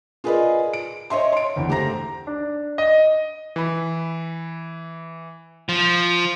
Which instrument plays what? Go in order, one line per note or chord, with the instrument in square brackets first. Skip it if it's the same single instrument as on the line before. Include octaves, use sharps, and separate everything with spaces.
[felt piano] F4 G#4 A#4 B4 D5 D#5
D7
C#5 D#5 E5 C6
C6 D7
G1 E2
A3 G4 C5 A#5 A#6
[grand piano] D4
D#5
[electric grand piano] E3 B5
[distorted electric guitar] F3